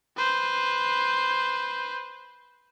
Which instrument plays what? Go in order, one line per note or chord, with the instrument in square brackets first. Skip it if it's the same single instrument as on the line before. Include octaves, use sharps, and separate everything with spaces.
[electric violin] B4 C5